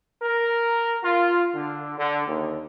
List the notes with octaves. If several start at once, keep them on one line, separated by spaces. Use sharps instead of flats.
A#4
F4
D3
D3
D#2